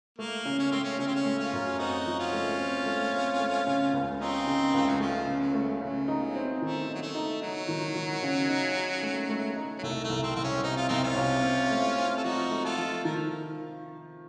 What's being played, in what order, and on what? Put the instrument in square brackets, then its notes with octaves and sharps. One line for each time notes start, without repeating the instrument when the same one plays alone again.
[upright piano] A3 [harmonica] A#3
[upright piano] C#3
[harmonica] C#4
[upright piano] A3 [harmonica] C4
[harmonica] C#4
[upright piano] C#3 [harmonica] C#4
[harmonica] C4
C#4
[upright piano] A3
[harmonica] C#4 F4
[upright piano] F#2
[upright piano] C4 [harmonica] D#4 F#4
[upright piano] F3
[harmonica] C#4 F4
[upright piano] A3
C4
A3
C4
A3
C#3
C#2
[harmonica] C4 D#4 [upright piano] C#4
[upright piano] C#3
[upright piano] C#2 [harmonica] A3
[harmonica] F#3
[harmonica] F3 [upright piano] A3
[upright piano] C#3
[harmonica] F#3
[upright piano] A3
[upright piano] C#3 [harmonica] F#3
[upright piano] D#4
C4
[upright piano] D#3 [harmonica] A3
[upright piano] D#4
[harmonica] F#3
A3
[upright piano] D#4
[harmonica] F#3 [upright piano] D#4
[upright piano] D#3
D#3
C#3
D#4
D#4
A3
A3
D#4
[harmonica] F#3
[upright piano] C2 [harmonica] A3
[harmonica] A3
[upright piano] C2
[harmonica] C4
[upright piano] C2 [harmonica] C4
[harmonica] C#4
[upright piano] C3 [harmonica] D#4
[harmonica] F4
[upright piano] C2 [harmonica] C4 D#4
[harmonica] C#4 F4
[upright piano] C3
C4
A3
C4
[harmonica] A4
[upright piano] F3 [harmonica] D#4 F#4
[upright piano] A3
[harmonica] F4 A4
[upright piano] F3
[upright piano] D#3 [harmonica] A#4